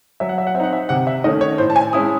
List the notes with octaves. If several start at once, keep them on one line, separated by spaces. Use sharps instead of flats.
F#3 E5
F#5
E5
F#5
C4 E5
D#4 F#5
E5
C3 F#5
E5
D#3 A3 C#4 D#5
C#5
A2 C5
A5
G#5
G#3 C#4 E4 D#6